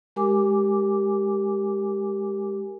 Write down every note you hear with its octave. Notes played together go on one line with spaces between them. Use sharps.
G#3 G4 A#4 G#5 D6